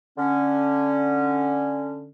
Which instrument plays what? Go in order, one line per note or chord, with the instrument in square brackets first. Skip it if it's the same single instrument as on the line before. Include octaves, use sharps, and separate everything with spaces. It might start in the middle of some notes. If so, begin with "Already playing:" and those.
[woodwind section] D3 C#4